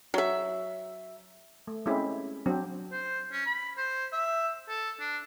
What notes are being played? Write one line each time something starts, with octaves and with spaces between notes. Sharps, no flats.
F#3 E5
A3
G#3 A3 C4 C#4 E4 G4
F#3 C4 D4
C5
C#4
B5
C5
E5
A4
D4